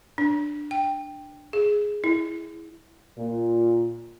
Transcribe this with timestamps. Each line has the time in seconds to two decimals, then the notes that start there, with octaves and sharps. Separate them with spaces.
0.18 D4
0.71 G5
1.53 G#4
2.04 E4
3.17 A#2